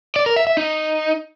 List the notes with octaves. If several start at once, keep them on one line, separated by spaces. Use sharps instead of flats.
D5
A#4
E5
E5
D#4